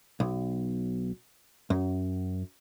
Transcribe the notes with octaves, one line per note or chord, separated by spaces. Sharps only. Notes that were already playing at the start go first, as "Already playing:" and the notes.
B1
F#2